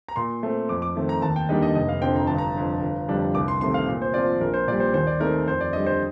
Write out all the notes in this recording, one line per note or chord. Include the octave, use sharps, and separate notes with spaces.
A#5
A#2 C6
A3 C4
F2 D6
D6
D#3 A3 C4
A#5
D#2 A5
G5
D3 G3 A#3 D#4 D#5
D#5
F1 D#5
F5
F2 D3 F3 C4 G5
A#5
G1 A5
A#5
F2 D3
G1
F2 D3 G3 D4
C2 D6
C6
C3 D#3 A3 C4 C6
F5
A#2
C5
F3 C4 F4 D5
A#1 A#4
C5
A#2 G3 D5
C5
D#2 C5
D5
D#3 A3 C4 D#4 A#4
F2 C5
D5
D3 G3 D#5
C5